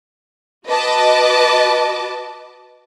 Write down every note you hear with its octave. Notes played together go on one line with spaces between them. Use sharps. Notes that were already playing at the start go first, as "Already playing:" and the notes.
F#4 B4 D#5 A5 D6